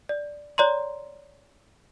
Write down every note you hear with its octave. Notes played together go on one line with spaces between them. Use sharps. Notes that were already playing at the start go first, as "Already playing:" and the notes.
D5
C#5 D5 A#5 C6